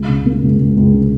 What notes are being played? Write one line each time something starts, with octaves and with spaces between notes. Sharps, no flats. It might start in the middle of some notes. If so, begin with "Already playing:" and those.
Already playing: C#2
C#3
A#3
C#2
C#2
C#2
C#3